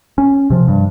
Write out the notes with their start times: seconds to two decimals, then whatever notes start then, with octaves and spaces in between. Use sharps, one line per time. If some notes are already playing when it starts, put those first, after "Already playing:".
0.18 C#4
0.50 C3 F3
0.68 G2